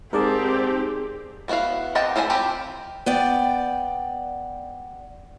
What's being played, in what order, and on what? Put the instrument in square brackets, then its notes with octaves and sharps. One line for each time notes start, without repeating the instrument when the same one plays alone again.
[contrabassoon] G#2 [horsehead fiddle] C4 G4 [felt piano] G#4 [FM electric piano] A#4 D5 A5
[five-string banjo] G3 B3 E4 F#4 F5
C4 G4 D#5 F#5 A5
F3 A4 C5 G#5 B5
F3 C4 G4 G5 B5
[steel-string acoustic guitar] B3 D5 G5